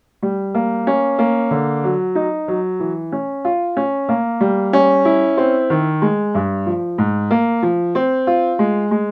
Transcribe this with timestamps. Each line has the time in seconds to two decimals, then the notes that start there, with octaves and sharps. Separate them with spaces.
0.23 G3
0.54 A#3
0.87 C#4
1.19 A#3
1.51 D3
1.84 F#3
2.15 D#4
2.48 F#3
2.80 E3
3.12 C#4
3.45 F4
3.77 C#4
4.09 A#3
4.41 G3
4.73 C#4
5.05 E4
5.37 C4
5.70 D#3
6.02 G#3
6.35 G2
6.66 F3
6.98 G#2
7.31 A#3
7.63 F3
7.95 C4
8.27 F4
8.59 G#3
8.91 G#3